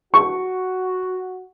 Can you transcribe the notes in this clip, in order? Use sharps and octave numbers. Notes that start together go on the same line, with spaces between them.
F#4 C#6